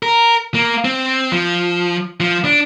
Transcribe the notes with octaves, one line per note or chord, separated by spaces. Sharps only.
A#4
A#3
C4
F3
F3
D4